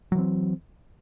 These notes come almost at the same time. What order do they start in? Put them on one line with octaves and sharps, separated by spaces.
F#3 E3 C4